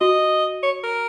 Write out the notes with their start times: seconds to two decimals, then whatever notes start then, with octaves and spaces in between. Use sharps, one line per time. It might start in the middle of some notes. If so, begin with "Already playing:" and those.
0.01 F#4 D#5
0.63 C#5
0.84 A#4